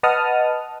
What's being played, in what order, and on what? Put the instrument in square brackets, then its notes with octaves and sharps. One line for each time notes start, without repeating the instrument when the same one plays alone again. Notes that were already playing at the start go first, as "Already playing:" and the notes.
[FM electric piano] B4 D#5 F#5 A5 D#6 F6